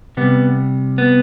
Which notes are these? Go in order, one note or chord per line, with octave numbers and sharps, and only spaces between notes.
C3 G3 B3
B3